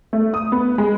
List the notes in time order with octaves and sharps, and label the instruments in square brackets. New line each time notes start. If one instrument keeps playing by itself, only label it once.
[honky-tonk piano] A3
D#6
B3
G#3